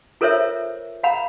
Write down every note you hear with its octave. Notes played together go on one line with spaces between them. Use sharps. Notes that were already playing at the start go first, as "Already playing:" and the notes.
F4 A4 A#4 C5 C#5 E5
F5 F#5 A#5 B5